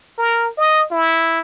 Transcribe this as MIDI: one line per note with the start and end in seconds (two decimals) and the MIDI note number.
0.19 0.49 70
0.58 0.84 75
0.91 1.40 64